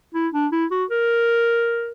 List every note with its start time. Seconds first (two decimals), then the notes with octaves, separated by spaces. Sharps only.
0.14 E4
0.34 D4
0.52 E4
0.71 F#4
0.90 A#4